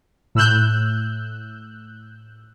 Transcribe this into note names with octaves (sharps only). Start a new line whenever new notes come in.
A2 E6 F#6 G6